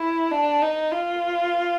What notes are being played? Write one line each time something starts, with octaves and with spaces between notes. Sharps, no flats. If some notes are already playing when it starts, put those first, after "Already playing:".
Already playing: E4
D4
D#4
F4